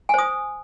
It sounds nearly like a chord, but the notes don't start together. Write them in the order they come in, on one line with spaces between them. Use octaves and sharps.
G#5 C5 D#6